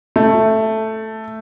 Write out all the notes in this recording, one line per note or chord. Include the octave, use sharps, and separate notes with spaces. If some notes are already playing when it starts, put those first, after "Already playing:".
A3